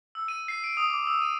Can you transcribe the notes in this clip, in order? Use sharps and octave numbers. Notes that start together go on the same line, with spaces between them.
E6
D#7
C7
D7
D#6
D6
E6
D#7